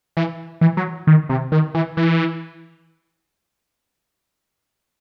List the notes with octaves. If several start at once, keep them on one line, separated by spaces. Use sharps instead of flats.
E3
E3
F#3
D#3
C3
D#3
E3
E3